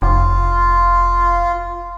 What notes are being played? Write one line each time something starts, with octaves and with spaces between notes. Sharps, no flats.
F1 F4